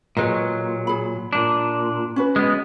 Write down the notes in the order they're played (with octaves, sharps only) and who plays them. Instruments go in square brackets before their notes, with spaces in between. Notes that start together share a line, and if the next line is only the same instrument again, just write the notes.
[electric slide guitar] A#2 F#3 [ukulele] G#4 B4 D#5
[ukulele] G#4 B5
[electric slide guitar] A#2 D4
[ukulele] C#4 F#4 B4
[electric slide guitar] G#3 B3